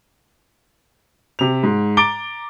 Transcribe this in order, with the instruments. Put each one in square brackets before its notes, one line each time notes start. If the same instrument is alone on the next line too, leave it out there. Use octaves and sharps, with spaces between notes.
[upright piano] C3 F7
G#2
A#5 D6 A6 D7 G7